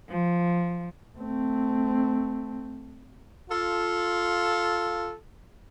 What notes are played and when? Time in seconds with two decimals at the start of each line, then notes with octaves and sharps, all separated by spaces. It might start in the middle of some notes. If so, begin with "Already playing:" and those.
0.11 F3
1.18 A3 C4
3.49 F4 A4